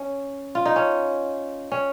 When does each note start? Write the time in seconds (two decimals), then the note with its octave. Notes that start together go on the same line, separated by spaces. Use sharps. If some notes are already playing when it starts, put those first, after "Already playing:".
Already playing: C#4
0.55 F4
0.66 D#4
0.76 C#4
1.72 C#4